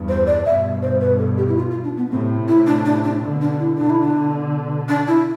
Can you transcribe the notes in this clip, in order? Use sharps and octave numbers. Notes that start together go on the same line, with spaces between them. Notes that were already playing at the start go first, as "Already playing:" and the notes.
Already playing: E2 G2
C5
D5
G2 B2 E5
C5
B4
A4
G4
E4
F4
F4
D4
B3
A2 C3 C4
E4
D4
D4
D4
B2 D3
D4
E4
B2 D3 D4
E4
D4
D4
E4